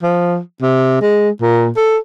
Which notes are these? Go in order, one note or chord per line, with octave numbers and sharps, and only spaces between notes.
F3
C3
G#3
A#2
A4